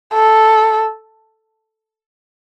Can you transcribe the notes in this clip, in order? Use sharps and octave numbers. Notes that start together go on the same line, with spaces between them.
A4